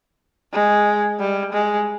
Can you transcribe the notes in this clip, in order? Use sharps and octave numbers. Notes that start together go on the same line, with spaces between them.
G#3
G3
G#3